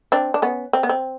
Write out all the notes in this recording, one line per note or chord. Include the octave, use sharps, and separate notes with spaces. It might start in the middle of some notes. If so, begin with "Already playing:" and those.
C4 D4
D4
B3 C#4
C4
B3
C4